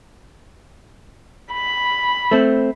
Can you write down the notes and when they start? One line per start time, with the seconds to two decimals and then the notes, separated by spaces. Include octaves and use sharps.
1.53 B5
2.31 A3 C4